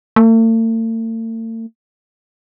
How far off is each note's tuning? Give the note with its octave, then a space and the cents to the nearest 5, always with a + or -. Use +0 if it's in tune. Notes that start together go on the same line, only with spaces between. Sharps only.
A3 +45